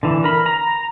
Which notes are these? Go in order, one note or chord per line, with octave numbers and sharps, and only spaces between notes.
D3 E3
A#4 B5
A#5